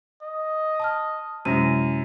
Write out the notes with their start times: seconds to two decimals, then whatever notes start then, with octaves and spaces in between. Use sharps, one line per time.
0.22 D#5
0.80 A5 D#6 F6
1.45 F#2 C3 G#3 E4 A#6 D#7